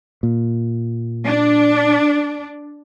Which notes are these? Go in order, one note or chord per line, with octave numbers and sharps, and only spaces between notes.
A#2
D4